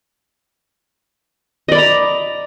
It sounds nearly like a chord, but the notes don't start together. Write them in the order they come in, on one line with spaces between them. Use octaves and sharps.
D#5 D5 B5 A#5